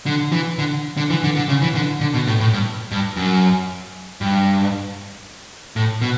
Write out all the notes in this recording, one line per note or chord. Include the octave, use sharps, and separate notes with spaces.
D3
E3
D3
D3
E3
D3
D3
C#3
E3
D3
D3
B2
A2
A2
G2
G2
F#2
G2
A2
B2